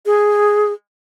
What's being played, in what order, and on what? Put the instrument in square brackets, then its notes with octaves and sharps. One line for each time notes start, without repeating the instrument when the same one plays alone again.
[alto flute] G#4